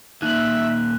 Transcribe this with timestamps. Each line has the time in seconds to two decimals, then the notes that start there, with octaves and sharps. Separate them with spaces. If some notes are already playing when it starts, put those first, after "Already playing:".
0.22 D#2 A#2 D#4 E5 F#6 F#7